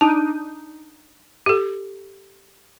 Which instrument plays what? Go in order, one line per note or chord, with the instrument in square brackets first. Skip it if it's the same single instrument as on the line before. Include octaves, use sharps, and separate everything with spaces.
[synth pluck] D4 D#4 [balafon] A5
[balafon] G4 A4